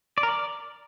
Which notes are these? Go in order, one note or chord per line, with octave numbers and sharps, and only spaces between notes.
D5
A#4
D5